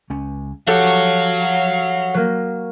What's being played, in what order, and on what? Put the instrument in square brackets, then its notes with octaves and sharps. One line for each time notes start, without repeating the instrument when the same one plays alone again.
[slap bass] C#2 G#3 C#4
[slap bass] F3 [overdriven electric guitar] F#4 C#5 [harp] G4 A4 F#5 [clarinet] F5
[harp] F#3 A#3